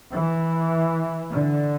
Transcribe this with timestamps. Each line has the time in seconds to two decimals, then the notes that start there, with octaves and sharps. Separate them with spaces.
0.11 E3
1.32 D3